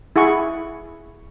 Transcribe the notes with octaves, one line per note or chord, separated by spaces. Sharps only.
E4 G#4 F#5 C#6